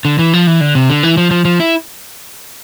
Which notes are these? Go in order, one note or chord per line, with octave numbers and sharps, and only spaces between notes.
D3
E3
F3
E3
D3
C3
D3
E3
F3
F3
F3
E4